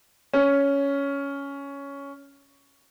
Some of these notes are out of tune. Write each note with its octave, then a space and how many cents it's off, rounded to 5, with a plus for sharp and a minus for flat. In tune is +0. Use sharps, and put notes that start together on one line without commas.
C#4 +10